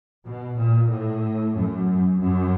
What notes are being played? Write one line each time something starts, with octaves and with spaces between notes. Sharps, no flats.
B2
A#2
A2
F#2
F#2